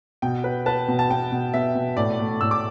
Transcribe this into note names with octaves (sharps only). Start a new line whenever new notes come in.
B2 G5
B4
B4 A5
B2
A5
B3 G5
B2
B3 E5
B2
A2 D5
A3
A2 E6
D6